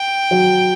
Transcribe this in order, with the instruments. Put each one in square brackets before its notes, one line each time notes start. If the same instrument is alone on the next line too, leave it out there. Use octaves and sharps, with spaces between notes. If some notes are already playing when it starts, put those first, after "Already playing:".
Already playing: [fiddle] G5
[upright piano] F#3